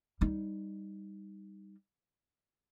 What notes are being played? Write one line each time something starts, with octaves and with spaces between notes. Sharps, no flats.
G3 D#4